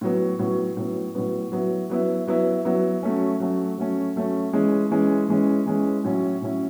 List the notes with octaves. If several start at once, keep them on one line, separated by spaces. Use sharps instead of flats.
A2 F#3 B3
A2 F#3 B3
A2 F#3 B3
A2 F#3 B3
F#3 B3 E4
F#3 B3 E4
F#3 B3 E4
F#3 B3 E4
F#3 A3 C#4
F#3 A3 C#4
F#3 A3 C#4
F#3 A3 C#4
E3 G#3 C#4
E3 G#3 C#4
E3 G#3 C#4
E3 G#3 C#4
A2 F#3 C#4 E4
A2 F#3 C#4 E4